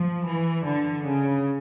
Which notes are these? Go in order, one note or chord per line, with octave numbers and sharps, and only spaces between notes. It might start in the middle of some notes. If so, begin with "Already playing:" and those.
Already playing: F3
E3
D3
C#3